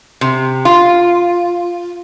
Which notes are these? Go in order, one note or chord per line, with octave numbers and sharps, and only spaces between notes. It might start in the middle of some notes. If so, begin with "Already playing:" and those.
C3
F4